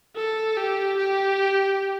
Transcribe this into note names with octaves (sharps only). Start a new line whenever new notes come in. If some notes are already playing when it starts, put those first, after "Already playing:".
A4
G4
G4